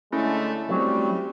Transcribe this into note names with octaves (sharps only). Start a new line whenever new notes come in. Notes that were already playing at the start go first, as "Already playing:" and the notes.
D3 G#3 A3 C#4 E4
F#3 G3 A3 C4